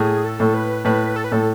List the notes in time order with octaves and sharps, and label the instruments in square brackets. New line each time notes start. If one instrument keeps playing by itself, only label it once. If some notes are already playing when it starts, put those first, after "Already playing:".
Already playing: [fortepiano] A2 [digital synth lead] G#4
[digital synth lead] A4
[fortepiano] A2
[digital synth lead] B4
[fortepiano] A2 [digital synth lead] B4
[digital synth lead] A4
B4
[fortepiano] A2 [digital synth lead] A4